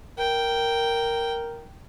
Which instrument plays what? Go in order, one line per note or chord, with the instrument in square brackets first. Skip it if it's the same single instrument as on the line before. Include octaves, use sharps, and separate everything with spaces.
[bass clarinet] A#4 [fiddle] G5